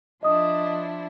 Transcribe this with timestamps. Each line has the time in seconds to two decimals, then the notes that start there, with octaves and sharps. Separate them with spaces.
0.23 F3 D4 E4 D#5 D#6